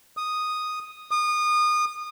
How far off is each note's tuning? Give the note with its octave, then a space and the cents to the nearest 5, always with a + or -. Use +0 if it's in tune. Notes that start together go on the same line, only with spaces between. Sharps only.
D#6 -5
D#6 -30